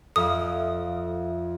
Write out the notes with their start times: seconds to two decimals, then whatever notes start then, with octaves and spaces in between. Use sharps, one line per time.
0.16 F2 A4 E5 F5 D#6